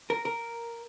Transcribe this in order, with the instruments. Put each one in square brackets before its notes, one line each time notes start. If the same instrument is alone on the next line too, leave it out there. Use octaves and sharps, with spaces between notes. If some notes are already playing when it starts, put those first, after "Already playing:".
[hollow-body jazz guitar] A#4
A#4